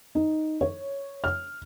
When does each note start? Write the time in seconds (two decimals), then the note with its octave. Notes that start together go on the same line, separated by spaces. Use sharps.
0.15 D#4
0.61 C#5
1.24 F6